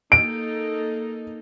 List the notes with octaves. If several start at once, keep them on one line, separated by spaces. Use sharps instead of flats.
A#3 D#4 A4 D7